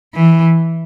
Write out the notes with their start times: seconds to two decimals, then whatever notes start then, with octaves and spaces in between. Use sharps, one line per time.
0.14 E3